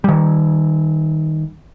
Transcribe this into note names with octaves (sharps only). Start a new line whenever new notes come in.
D#3 G3